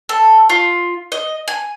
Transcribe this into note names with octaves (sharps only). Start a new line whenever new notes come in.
A4
F4
D#5
G#5